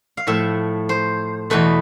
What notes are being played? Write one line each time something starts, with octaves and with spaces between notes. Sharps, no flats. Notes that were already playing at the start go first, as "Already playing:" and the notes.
F5
A2 F3 A3 E5
C5
E2 B2 A3 B4